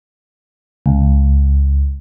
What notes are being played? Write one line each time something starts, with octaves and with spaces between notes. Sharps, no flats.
C#2